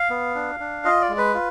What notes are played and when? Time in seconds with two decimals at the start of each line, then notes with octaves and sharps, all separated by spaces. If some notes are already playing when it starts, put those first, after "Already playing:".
Already playing: F5
0.10 B3
0.35 D4
0.60 D4
0.85 F4 D#5
1.01 D5
1.09 G#3
1.18 B4
1.34 F4